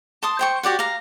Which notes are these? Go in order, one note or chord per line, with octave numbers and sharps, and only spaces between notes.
A5 C6 D#6
C5 G5 C#6
F#4 G4 D5 F#5
F5 A#5